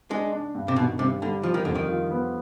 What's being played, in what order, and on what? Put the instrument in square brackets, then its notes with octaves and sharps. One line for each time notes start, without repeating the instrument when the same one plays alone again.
[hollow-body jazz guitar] G#3 [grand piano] D4
[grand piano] D4
G2
[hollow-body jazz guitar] C3
[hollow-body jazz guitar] B2 [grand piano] D#3
[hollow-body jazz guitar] C3 [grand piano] G3
[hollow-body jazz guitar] D3 [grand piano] G3
[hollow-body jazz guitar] F3 [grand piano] F4
[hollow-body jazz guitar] D#3
[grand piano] F2 [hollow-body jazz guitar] D3
[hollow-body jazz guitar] D#3
[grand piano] F4
B3